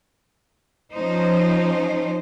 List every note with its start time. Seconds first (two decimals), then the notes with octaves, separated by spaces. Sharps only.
0.94 F3 C#4 D#4 C5